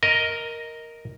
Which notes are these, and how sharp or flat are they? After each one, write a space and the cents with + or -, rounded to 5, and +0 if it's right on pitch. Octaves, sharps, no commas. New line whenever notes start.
A#4 +0 D#5 +10